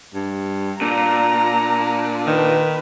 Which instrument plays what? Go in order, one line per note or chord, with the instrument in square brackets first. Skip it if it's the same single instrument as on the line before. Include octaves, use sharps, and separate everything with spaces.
[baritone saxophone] G2
[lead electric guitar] A#2 [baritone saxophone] D4 [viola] A#5
[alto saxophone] D#3 [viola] B4